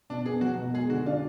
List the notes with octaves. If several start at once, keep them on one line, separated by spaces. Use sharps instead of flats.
B2 D4
B3 G#4
F#3 F#4
B2
G#3 G#4
D3 F#4
D4 F4